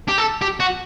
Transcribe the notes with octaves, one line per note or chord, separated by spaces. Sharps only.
G4
A4
G4
F#4